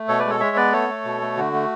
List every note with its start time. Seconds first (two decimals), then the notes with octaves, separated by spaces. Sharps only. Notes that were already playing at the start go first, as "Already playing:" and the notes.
Already playing: A3
0.08 B2 A4 C#5
0.19 B4 D5
0.25 G#3
0.30 A4 C#5
0.40 G#3 C#5 E5
0.56 B3 B4 D5
0.72 A3 A4 C#5
0.89 A3
1.05 B2
1.21 A3
1.37 D3 F#4
1.53 A3